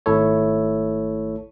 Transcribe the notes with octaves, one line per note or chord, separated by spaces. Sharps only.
G#1 A3 E4 A4 C#5